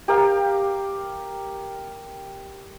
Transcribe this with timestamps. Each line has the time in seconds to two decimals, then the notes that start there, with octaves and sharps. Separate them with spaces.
0.08 G4 A#4 F5